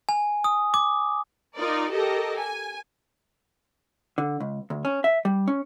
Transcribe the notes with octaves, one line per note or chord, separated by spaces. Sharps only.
G#5
D#6
D6
D#4 F4 A#4 D5
G4 A4 A#4 D#5
G#5
D3
C#2
D2
C#4
E5
G3
C#4